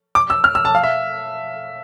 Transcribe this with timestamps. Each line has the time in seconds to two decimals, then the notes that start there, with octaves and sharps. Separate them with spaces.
0.15 D6
0.30 E6
0.44 F6
0.55 E6
0.65 A5
0.75 F5
0.83 E5